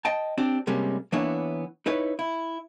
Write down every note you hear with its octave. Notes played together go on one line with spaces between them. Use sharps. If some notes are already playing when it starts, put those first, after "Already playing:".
D#5 G5 A5
C4 D4 G4
G2 C3 G3 G#3 A#3 C#4
E3 A#3 B3 D4 E4 C#5
D#4 E4 B4 C#5
E4